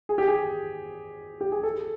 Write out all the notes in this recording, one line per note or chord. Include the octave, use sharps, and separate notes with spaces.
G#4
G4
G#4
G4
G#4
A4